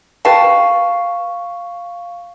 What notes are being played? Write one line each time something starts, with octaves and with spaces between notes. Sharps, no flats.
G4 B4 F5 A5 C#6 C7